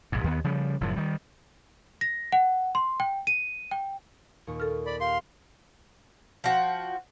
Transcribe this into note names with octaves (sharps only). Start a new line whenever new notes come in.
A#1 G#2
D#2 D#3 F#3 B3
C#3 F3 G3
F#1 F#2 A2 F3
D#3 G3
A#6
F#5
C6
G5
D#7
G5
D#2 A#2 C#6
A4 F6
D5 B5
G4 F5 C6 C7
F3 F#4 G5